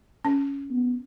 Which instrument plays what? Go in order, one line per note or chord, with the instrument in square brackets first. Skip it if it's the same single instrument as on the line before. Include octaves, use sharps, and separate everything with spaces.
[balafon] C#4
[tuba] B3